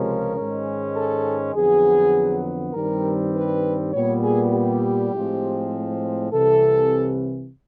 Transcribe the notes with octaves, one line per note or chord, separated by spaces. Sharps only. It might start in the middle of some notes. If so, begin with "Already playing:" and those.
Already playing: C#2 C3 F3 G#3 C#4 A#4
G#2 D#3 G#3 C#4
A4
F2 D3 F#3 B3 G#4
G2 D#3 G3 C4 A#4
B4
A#2 G3 B3 C#5
G#4
G4
A2 F3 G#3 C4
C2 C3 E3 A4